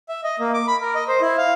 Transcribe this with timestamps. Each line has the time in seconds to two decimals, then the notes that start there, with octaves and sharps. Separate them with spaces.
0.09 E5
0.24 D#5
0.39 A#3
0.54 D6
0.67 B5
0.81 A#4
0.95 D#5
1.08 C5
1.21 E4
1.38 F5